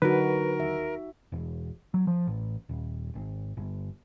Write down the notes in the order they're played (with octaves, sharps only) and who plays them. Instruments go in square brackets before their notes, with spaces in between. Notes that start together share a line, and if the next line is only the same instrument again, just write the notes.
[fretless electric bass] D3 F#3 [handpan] D#4 F#4 [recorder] A#4 [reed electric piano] B4
[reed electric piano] D#2 [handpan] E5
[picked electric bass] E1
F#3
F3
A1
D#1
G#1
G1